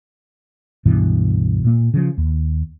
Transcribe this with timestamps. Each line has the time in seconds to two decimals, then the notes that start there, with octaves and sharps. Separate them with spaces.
0.85 C#2 G2 B2 E3
1.64 A#2 A#3
1.94 C#3 F3
2.18 D#2